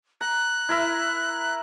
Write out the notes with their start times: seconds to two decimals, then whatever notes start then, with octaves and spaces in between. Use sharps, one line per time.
0.21 A#5 F#6
0.69 E4 A#4 E5